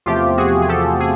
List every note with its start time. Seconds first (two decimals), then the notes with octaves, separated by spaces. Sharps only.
0.06 E2 C3 F3 A3 F4 G4
0.37 F#4 G#4
0.62 G#4
0.69 G4 A4
1.00 G#4